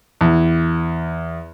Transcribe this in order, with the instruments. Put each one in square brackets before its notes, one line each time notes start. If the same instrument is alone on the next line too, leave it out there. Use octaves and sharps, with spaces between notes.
[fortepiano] E2